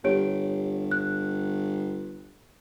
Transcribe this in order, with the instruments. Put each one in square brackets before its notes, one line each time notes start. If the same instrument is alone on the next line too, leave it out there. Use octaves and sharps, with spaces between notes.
[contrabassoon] G1 [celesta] G4 C#5 D7
[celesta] F#6